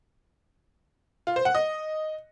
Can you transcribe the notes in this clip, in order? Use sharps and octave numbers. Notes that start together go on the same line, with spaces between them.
F4
C5
F#5
D#5